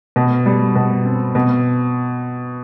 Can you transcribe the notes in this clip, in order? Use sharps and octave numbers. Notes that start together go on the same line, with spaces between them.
B2
G3
B2
C4
B2